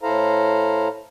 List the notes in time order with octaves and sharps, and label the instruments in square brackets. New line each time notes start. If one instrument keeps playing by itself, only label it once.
[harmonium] A2 E4 A4 C5 F5 A#5